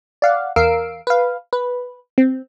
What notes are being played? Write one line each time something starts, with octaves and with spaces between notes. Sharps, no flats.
D5 F5 F#5
E2 A#4 F5 E6 C7 D7
B4 F5
B4
C4